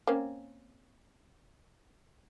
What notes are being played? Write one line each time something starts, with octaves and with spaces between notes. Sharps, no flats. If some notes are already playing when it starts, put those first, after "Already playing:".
A#3 C4 C#4